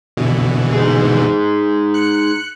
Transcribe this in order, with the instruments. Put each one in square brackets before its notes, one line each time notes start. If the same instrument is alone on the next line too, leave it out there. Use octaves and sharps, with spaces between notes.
[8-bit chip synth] B2 D3 E3
[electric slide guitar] D#4 G#4
[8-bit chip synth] F#6 C#7